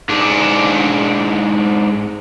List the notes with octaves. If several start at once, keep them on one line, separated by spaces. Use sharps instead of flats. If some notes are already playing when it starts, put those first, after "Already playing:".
G#2 D4